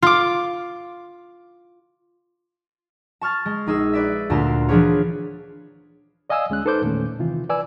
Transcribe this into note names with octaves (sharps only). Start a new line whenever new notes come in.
F4 D6
A5 C#6 F6 A6
G#3
A#1 D#4 G#4 E6
B4 D5 E5
D2 A#2 A5 A#5 C6
E3 F3 D4 G#4 B4 C#5
D5 D#5 F5 G#5 D#6 E6
D2 G#3 C#4 F#6
D#4 A4 B4 C5 D6 G6
E2 A#2 D#3 A3 C#4
C3 D#3 E3 F4
B4 D5 G#5 E6